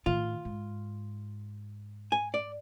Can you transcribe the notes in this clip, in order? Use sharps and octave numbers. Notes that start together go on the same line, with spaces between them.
A2 D#3 F4
G#2
G#5
D5